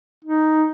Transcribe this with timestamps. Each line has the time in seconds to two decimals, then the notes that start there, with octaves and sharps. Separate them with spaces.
0.25 D#4